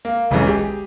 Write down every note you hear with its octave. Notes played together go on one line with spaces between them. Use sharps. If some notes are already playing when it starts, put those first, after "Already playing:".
A#3
E1 B1 E3 C#4
G4 G#4